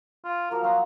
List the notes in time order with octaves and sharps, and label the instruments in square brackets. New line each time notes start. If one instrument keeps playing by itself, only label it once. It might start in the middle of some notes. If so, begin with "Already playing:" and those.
[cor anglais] F4
[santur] F3 A#3 F#4 [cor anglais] A#4
[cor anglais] F#3 [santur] B3 A#5 C6